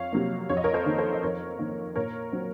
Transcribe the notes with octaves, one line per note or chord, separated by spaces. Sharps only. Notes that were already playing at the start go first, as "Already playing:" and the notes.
Already playing: F2 C#5 F5
C3 F#3 A#3
F2 C#5
D#5
A#4 C#5
A4 C5
D#3 A#3
A4 C5
D#5
F2 A#4 C#5
D#3 A#3
A#2 A#4 C#5
F#3 C4